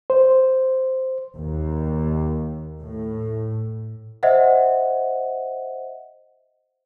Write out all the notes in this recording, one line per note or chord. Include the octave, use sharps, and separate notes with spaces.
C5
D#2
A2
C5 D#5 E5 F#5